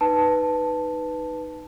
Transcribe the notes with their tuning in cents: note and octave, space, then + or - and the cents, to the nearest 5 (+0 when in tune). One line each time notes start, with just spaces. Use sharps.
D#4 +0 B4 +0 A5 +0